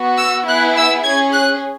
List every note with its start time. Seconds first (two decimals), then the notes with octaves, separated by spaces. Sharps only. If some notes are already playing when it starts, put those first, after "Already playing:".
Already playing: B3 F#4
0.19 E6
0.47 B3 E4 G#4 F#6
0.76 E6
1.04 C#4 G#4 G#6
1.33 F#6